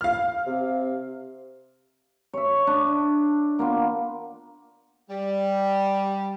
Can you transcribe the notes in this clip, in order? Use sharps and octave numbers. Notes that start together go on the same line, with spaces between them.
F5 F6
C3
C#5 E5
D4
A#3 B3 F4
G3